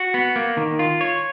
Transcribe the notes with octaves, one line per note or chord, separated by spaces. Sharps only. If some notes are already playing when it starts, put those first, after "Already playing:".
Already playing: F#4
B3
A#3
D#3
F4
C#5